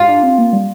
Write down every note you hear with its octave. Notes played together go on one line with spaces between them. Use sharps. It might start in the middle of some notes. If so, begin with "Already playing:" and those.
Already playing: F4
D4
C4
A#3
G3